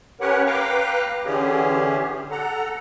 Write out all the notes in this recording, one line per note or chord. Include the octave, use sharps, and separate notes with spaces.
C#4 G4 A#4 B4 C#5 F#5
B4 F5 G5 A#5 D6
D3 E3 C#4 G4 G#4
A4 F#5 A#5